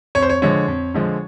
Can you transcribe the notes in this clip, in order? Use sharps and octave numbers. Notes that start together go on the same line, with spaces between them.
F2 C#5
C5
C#5
D3 F3 G#3 C#5
F2
D3 F3 G#3